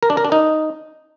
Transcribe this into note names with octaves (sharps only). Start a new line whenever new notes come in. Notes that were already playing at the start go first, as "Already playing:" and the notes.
A#4
D4
A#4
D4
D#4